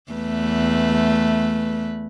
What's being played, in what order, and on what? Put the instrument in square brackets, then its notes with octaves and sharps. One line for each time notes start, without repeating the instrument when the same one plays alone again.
[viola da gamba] E2 A3 B4